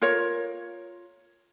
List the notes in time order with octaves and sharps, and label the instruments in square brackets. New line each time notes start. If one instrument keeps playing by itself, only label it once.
[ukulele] F4 A#4 C#5